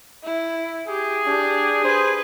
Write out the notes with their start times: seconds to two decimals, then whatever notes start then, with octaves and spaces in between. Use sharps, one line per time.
0.24 E4
0.88 G4 G#4
1.27 D4 G4
1.85 B4 C5